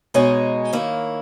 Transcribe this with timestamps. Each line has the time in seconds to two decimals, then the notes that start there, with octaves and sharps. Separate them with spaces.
0.14 B2 G#3 D#4 G#4 C#5
0.73 D#3 A#3 E4